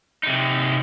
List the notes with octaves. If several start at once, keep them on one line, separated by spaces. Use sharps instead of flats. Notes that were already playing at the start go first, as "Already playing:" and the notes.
C3 D#4